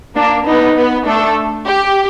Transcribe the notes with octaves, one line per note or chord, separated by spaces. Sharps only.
A#3 D4 A#4
B3 D#4 B4
B3 B4
A3 D4 A4
G4